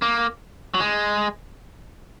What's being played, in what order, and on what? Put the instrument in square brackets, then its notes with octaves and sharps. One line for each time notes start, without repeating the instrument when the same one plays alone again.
[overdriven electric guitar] A#3
F#3
G#3